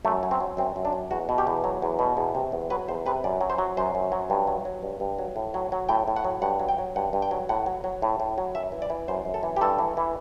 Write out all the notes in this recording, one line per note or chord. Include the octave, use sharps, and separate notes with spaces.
F#2 A3
F#3
C4
F#3
F#2 C4
F#2
D4
F#3
E2 F#4
B2
G4
E2
F#3
E2
B2
E2
C3
E2
F#3 B4
E2 C5
C3 B4
F#2 D5
F#3
C5
F#3
F#2 C5
F#2
F#3
G2
F#3
F#3
G2
G2
F#3
A2
F#3
F#3
A2 G5
A2
F#5
F#3
G2 F#5
F#3
G5
F#3
G2 F#5
G2
G5
F#3
A2 F#5
F#3
F#3
A2
A2
F#3
F#2 E5
E3
D5
E3
F#2 C5
F#2
A4
E3
G4
G2 A4
E3
E3